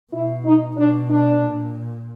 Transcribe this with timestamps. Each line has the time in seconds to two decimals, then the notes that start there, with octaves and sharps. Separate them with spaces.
0.12 B2 E4
0.45 D#4
0.77 B2 D4
1.10 D4
1.42 A#2